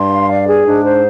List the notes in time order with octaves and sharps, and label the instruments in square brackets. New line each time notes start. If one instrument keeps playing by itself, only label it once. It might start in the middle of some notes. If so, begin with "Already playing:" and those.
Already playing: [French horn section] G2 [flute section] C6
[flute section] F5
D5
G#4
[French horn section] G#2 [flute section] D4
[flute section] C5